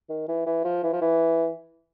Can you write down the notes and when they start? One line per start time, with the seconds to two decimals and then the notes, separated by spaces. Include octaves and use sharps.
0.09 D#3
0.28 E3
0.46 E3
0.64 F3
0.83 E3
0.93 F3
1.01 E3